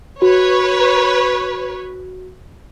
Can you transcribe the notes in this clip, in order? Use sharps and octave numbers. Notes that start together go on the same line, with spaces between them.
F#4 B4 C#5